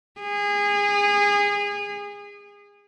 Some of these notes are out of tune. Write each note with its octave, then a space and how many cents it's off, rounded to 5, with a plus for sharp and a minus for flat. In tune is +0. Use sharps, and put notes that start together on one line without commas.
G#4 -25